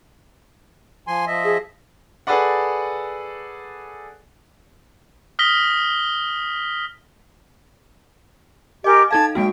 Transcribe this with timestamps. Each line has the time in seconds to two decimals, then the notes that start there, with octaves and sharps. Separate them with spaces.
1.08 F3 G#5 C6
1.27 F3 D#5 E5
1.44 G#4
2.27 G#4 A4 B4 D5 F#5
5.39 D#6 F6 A#6 B6 G7
8.84 G4 A#4 D#5 G#5 D6
9.11 D#4 A4 F5 A5 G#6
9.35 G#3 A#3 F#4 G5